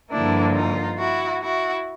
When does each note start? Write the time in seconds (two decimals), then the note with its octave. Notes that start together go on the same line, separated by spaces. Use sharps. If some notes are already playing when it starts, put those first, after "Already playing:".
0.11 G2 D3 F3 A#3 D4 E4
0.54 D#4 F4
0.98 E4 F#4
1.42 E4 F#4